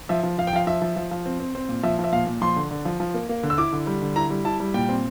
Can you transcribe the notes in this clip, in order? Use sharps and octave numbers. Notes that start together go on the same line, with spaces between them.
F3 E5
F3
F3 F5
G5
F3 F5
F3 E5
F3
F3
F3
C4
C4
C4
A#2
F3 E5
F3
E5
A#2 F5
A#2
F3 C6
D3
D3
F3
F3
A#3
A#3
D3
E6
E4 D6
D3
G3
D3
E4 A#5
G3
E4 A5
G3
A#2 G5
C4